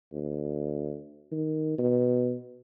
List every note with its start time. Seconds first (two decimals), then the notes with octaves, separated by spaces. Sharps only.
0.13 D2
1.31 D#3
1.79 B2